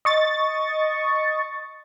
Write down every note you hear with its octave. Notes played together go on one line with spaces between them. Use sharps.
D#5 C#6 A6